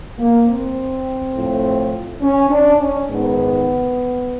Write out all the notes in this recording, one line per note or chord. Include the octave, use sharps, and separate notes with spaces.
A#3
C4
A2 F3
C#4
D4
C#4
G#2 D#3 B3